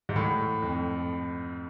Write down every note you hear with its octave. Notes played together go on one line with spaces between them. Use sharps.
G#2
A2
F2